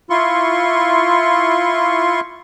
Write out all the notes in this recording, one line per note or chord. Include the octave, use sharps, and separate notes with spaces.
E4 F4 C6 C#6